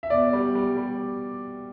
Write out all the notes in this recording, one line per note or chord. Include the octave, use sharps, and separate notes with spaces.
E5
B2 D5
G3
G3
G3